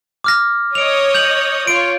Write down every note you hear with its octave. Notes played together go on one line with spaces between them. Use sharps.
D6 F6 A#6
C#5 D#5 D#6 D7 F7
G6 F7 F#7
F4 C#5 D7